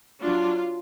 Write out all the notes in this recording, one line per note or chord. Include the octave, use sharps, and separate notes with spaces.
F#3 D4 F4